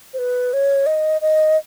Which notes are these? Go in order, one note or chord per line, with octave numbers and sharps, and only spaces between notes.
C5
B4
C#5
D#5
D#5